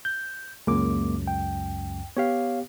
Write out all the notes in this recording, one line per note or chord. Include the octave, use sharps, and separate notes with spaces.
G6
C#2 F#2 G#3 A#3 D6
G5
B3 G4 C#5 F5